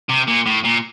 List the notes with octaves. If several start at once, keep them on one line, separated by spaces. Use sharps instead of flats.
C3
A#2
A2
A#2